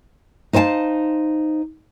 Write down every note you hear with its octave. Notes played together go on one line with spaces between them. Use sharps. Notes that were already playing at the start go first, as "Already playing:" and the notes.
D#4 C5 F5 F#5 A5